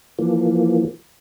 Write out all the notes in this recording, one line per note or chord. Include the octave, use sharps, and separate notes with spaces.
E3 F3 A#3